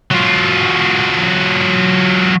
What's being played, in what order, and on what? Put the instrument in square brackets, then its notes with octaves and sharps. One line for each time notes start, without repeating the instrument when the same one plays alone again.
[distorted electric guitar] F#3 F4